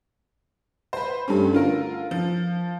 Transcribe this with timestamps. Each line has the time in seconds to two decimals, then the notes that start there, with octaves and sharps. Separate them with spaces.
0.93 B4 C5
1.28 G2 G3 A3 C#4
1.53 D3 F4 A#4
2.11 F3